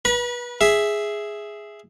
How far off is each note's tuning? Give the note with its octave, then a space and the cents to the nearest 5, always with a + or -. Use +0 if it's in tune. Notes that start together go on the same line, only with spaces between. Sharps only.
B4 -25 B5 -45
G#4 +0 E5 +0